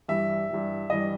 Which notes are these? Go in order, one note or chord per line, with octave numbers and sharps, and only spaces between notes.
G2 E3 G3 E5
G2 E3 G3
G2 E3 G3 D#5